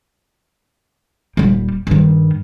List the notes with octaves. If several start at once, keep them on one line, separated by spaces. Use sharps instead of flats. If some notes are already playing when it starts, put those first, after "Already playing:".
D#1 G3
G2 D#3